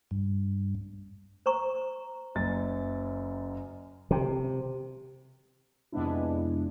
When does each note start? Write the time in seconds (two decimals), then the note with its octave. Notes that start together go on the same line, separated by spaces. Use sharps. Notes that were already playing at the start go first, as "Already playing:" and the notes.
0.11 G2
1.46 C5 A#5 C#6
2.35 F#1 F#2 A6
4.11 C3
5.92 F2 C3 G#3 B3 D4 E4